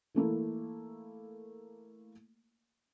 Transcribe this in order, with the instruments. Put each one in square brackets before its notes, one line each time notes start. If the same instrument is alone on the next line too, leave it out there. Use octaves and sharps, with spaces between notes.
[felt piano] E3 A3 A#3 E4